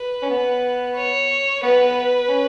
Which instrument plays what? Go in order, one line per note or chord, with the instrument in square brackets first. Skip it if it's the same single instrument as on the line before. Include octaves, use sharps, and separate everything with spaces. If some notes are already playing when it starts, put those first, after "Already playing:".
Already playing: [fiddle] B4
[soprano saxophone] C#4
B3
[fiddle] C#5
[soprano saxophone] B3 [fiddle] B4
[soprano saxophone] C#4